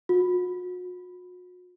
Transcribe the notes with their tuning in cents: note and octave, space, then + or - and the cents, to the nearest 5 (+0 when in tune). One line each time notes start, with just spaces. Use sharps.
F#4 -40